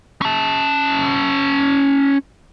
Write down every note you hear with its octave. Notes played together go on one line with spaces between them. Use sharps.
C#4 A5